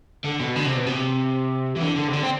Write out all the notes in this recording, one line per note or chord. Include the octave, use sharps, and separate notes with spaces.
D3
B2
D3
C3
B2
C3
E3
D3
D3
C3
D3
C4